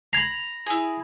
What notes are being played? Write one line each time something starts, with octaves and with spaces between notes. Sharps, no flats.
A#5 B5 G#6 C7
E4 G#4